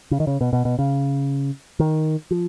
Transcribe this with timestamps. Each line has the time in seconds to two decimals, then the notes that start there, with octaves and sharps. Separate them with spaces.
0.11 C#3
0.20 D#3
0.27 C#3
0.41 B2
0.53 B2
0.65 B2
0.79 C#3
1.79 D#3
2.31 F3